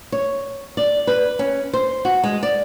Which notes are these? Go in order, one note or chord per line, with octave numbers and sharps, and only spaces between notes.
C#5
D5
B4
C#4
C5
F#4
G#3
D5